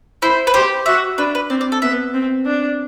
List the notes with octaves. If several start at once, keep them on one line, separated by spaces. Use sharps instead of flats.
E4 C5
B4
G4 C5
F#4 E5
D4 B4
B4
C4 D5
D5
A4
B3 E5
C4
D4